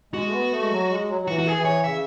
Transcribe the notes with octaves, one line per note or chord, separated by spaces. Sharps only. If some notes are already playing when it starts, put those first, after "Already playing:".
G#3 F#4
A3
B3
A3
G#3
F#3
G#3
F#3
F#3
E3 F#4
F#4
G#4
E3
C#5
C#3 E5